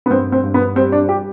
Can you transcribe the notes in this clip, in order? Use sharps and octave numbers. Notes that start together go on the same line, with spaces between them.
B3
G2 C4
C4
G2
B3
G3 C4
D4
G4